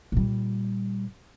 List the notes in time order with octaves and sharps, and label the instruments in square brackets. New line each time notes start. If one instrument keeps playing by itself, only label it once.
[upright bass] A#2 G3